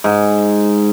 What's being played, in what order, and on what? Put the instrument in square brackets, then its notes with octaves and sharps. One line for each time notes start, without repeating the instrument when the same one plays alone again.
[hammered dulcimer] G#2